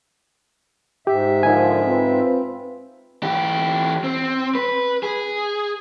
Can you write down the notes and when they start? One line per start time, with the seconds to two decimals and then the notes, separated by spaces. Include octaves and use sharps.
1.07 G#2 G4 E5
1.43 D3 F3 D#4 A#4 G#5
1.84 C4 F4 B4
3.23 E3 G4
4.04 C4
4.55 B4
5.03 G#4